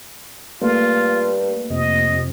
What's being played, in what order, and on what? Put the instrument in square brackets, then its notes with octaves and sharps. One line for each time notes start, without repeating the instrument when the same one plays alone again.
[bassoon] G2 [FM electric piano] A3 A#3 [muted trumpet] F4
[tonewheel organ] F2 C3 [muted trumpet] D#5